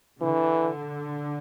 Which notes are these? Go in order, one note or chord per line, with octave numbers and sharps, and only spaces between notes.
D3 E3